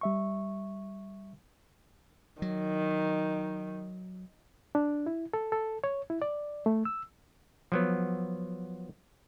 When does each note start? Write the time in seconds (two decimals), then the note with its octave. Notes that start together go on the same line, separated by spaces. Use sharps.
0.01 G3 E5 C#6
2.42 D#3 F#3
4.75 D4
5.06 E4
5.33 A4
5.52 A4
5.84 C#5
6.10 E4
6.22 D5
6.66 A3
6.85 E6
7.72 F3 F#3 B3